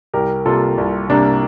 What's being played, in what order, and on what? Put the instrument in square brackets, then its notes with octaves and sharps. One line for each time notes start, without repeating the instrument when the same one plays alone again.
[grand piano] C2 G4 A#4
C3 G3 A#3 F4 A4
C2
C3 G3 A#3 D4